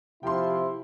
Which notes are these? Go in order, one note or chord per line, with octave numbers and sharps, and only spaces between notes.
C3 F3 E4 G5 C6